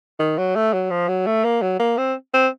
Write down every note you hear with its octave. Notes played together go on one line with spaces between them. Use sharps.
D#3
F#3
A3
F#3
F3
F#3
A3
A#3
F#3
A#3
C4
C4